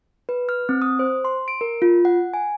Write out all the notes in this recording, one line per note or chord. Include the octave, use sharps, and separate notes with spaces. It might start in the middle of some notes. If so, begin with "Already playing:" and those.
B4
F6
C4
D#6
C5
C6
D7
A#4
F4
F#5
G#5